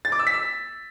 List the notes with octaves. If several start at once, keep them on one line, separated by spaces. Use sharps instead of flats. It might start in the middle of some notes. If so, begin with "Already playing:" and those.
A6
D6
E6
B6
E6